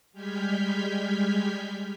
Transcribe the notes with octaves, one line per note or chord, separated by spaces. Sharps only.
G3 G#3 F6 G6 G#6 B6